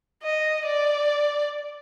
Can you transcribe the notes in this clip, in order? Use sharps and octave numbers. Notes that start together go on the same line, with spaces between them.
D#5
D5